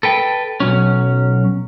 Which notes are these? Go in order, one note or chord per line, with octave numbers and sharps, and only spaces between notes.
A4 B4 G5
B1 F#3 C#4